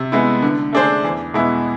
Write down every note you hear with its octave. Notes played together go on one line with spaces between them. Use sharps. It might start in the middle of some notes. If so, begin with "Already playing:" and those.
Already playing: C3
G#3 B3 E4
D3
A3 D4 G#4 C5
E2
B2 G#3 B3 E4